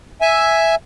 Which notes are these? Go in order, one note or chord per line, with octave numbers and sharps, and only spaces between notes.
E5 G#5